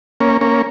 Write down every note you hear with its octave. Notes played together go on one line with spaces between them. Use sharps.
A#3 C#4
A#3 C#4